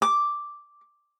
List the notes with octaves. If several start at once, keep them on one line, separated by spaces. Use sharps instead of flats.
D6